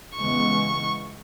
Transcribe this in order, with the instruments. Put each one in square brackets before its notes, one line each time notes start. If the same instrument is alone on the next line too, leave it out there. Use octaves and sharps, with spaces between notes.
[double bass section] E2 C#3 E3 G#3 B3 [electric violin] C#6